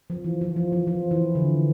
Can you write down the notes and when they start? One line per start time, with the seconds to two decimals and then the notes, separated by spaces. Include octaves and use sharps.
0.10 F3
0.24 E3
0.41 F3
0.56 F3
0.73 F3
0.87 F3
1.11 E3
1.35 D3